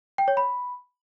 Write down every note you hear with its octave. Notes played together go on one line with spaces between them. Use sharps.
G5
C#5
B5